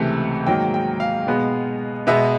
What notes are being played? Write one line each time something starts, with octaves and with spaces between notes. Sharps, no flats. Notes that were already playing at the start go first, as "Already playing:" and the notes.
Already playing: C#2 C3 E3 A3
G#2 D#3 F#3 A#3 G5
G5
F5
B2 G#3 B3
B2 G#3 B3 E5